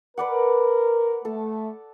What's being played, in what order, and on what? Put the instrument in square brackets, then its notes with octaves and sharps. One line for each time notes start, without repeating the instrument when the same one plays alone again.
[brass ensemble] A#4 [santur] B4 D5 F#5
[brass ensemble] A3 [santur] A4